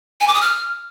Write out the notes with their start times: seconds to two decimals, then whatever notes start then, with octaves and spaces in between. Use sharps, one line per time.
0.21 G#5
0.28 D6
0.34 D#6
0.41 F6